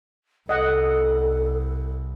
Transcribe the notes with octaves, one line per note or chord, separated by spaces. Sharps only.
C2 A4 D#5 F#5